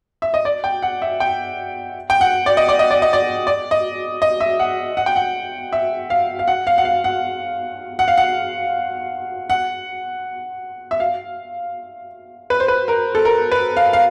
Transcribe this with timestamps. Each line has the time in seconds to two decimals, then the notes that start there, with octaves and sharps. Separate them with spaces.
0.22 E5
0.34 D#5
0.45 D5
0.64 G5
0.82 F#5
1.02 E5
1.20 G5
2.10 G5
2.21 F#5
2.46 D5
2.57 D#5
2.69 D5
2.79 D#5
2.91 D5
3.02 D#5
3.13 D5
3.47 D5
3.71 D#5
4.22 D#5
4.40 E5
4.59 F#5
4.97 F#5
5.06 G5
5.16 F#5
5.73 E5
6.10 F5
6.39 F5
6.48 F#5
6.67 F5
6.78 F#5
6.85 F5
7.04 F#5
7.99 F#5
8.08 F5
8.18 F#5
9.50 F#5
10.91 E5
11.00 F5
12.50 B4
12.60 C5
12.68 B4
12.88 A#4
13.15 A4
13.25 A#4
13.52 B4
13.77 F5
13.93 F5